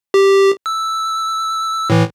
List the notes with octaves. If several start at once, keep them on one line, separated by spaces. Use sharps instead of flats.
G4
E6
A2 E3